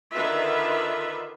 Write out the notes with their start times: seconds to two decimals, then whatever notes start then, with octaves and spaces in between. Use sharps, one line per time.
0.14 D3 D#3 F4 B4 E5